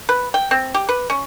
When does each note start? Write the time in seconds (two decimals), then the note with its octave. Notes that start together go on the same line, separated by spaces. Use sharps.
0.09 B4
0.34 G5
0.51 C4
0.74 G4
0.89 B4
1.10 C#4